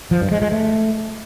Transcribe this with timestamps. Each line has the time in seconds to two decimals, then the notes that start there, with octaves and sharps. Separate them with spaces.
0.11 F3
0.21 G2
0.32 G#3
0.42 G#3
0.52 A3